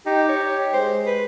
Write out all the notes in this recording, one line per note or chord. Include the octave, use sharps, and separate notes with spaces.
D#4 G4
C#5
G#3 C5
B4